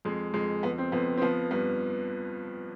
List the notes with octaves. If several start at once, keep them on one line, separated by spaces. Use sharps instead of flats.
F2 G#3
F2 G#3
F2 B3
C4
F2 B3
C4
F3 B3
G2 B3